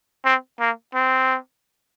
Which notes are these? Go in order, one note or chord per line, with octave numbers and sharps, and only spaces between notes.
C4
A#3
C4